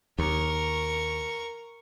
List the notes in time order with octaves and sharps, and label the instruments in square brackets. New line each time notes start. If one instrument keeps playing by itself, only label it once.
[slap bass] D#2 [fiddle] A#4 C#6